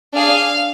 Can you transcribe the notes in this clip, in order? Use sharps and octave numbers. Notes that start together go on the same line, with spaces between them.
D4 G#4 F5